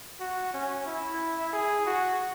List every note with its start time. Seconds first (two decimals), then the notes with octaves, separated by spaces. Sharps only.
0.20 F#4
0.53 C#4
0.86 E4
1.53 G#4
1.86 F#4